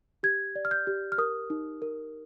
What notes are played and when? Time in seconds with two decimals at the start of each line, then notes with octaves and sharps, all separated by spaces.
0.23 G4 G#6
0.56 D5
0.65 F6
0.71 G6
0.87 G4
1.12 F6
1.18 A#4 D#6
1.50 D#4
1.82 A#4